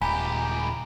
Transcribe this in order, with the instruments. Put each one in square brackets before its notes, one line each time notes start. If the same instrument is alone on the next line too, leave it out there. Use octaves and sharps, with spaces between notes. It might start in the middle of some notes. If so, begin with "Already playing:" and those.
[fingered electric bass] D#1 [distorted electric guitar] C#2 G4 [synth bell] G#5 A#5 [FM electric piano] B5